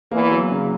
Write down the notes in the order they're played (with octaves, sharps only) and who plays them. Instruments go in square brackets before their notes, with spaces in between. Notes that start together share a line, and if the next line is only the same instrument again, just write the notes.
[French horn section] E2 E3 [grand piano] A#3
[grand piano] F#3
C#3